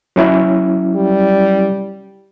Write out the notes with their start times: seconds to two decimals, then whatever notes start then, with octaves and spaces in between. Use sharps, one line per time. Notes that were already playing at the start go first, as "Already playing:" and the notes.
0.16 F#3 C#4 E4
0.96 G3